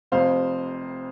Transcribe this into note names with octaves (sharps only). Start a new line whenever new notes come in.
F1 F2 C3 C5 F5